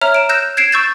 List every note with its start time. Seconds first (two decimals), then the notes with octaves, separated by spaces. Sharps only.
0.01 C#5 E5 A#5 F6 F7
0.14 D7 E7
0.29 E6 F#6 G6 A#6 E7
0.57 G#6 C7 D7 E7
0.72 C#6 E6 G6 A6 E7